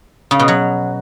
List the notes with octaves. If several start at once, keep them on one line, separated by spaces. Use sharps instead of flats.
C#3
B2
F#3